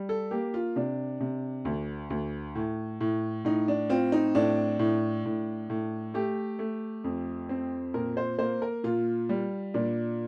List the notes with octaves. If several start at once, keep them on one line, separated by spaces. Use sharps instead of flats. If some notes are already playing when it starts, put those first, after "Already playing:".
Already playing: G3
A4
A#3 G4
F4
C3 D4
C3
D2
D2
A2
A2
A2 D#4
D4
C4 F4
D#4
A2 D4
A2
A2
A2
A3 G4
A3
F2
C4
A#2 A#4
C5
A#3 C5
A#4
A#2 F4
G3
A#2 D4